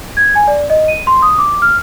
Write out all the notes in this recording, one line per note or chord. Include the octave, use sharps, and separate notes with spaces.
G#6
G#5
D5
D#5
D#7
C6
D#6
D6
F6